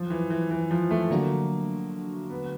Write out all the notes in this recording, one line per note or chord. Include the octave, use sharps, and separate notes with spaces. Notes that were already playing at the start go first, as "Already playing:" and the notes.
Already playing: F3 F#3
E3
E3
E3
F3
A3
D3 F#3 A3 A#3 D4 F#4
B3